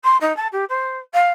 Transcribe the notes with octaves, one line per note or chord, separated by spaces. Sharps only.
C6
D#4
A5
G4
C5
F5